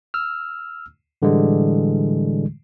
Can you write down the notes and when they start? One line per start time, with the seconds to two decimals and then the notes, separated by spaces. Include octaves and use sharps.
0.14 E6 F6
1.22 A2 D3 E3 G3 G#3